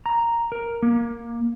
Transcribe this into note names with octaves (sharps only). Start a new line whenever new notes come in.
A#5
A#4
A#3